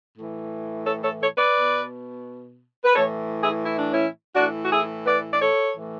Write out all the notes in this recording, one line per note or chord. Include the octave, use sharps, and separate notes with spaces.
A2 E3
A4 C#5
A4 C#5
A4 C#5
B4 D5
B2
B4
A2 E3 A4 C#5
E4 G#4
E4
D4
C#4 E4
A2 E3 D4 F#4
F#4
E4 G#4
B4 D5
D5
A4 C#5
A2 E3